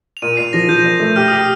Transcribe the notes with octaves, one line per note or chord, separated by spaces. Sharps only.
F7
A#2 D#7
A#2 C7
F3 A#6
F3 G6
A#2
A3
G4 F6
G4 D#6
F6